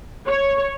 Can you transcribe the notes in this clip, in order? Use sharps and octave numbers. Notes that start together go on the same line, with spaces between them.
C#5